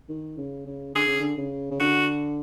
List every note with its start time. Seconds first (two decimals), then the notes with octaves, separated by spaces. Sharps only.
0.09 D#3
0.38 C#3
0.66 C#3
0.95 D3 G#4
1.07 C#3
1.20 D3
1.37 C#3
1.71 C#3
1.80 D3 F#4